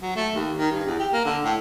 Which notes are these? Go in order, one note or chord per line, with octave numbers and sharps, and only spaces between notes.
F#3
A3
D#2
D#3
G2
E2
G4
A#3
D3
A2